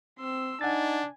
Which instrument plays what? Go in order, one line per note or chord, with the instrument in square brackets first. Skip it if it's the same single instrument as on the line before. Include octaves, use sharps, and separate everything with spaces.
[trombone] C4 [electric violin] C6 E6
[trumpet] D4 [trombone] D#4 [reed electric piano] F#5 A6 [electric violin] G#5